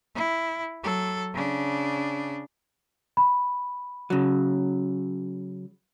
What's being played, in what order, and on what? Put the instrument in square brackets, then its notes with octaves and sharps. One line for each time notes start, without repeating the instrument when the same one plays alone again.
[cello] E4
F#3 A4
C#3 D4
[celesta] B5
[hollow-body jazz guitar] C#3 F#3